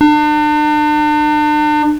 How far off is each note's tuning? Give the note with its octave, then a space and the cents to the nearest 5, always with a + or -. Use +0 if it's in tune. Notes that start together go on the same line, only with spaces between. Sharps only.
D4 +40